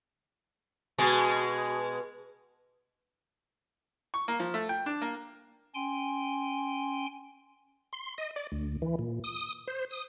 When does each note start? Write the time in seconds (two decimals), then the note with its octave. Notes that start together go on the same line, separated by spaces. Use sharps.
0.98 B2 G#3 G#4
4.14 C#6
4.28 A#3
4.40 F3
4.54 A3
4.69 G5
4.86 D4
5.02 A#3
5.75 C#4 G5 G#5 C6
7.93 C6
8.18 D#5
8.36 D5
8.52 D2
8.82 E3
8.99 A#2
9.24 D#6
9.68 C5
9.91 D#6